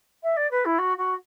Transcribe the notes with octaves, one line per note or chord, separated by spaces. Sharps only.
E5
D5
B4
E4
F#4
F#4